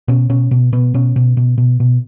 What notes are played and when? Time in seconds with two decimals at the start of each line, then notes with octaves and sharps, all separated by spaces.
0.08 B2 C#4
0.29 B2 C#4
0.51 B2
0.73 B2 B3
0.94 B2 C#4
1.16 B2
1.37 B2
1.58 B2
1.80 B2